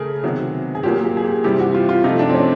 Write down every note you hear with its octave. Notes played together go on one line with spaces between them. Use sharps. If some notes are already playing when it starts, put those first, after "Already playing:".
Already playing: C#3 A3 G#4 A#4
C3 D#3 F#3 B3
G#4
A#2 F#3 A#3 G4
G4
G#4
G4
C3 E3 G3 G4
F#4
F4
F4
C3 F3 A3 D#4
D4
C4
C#4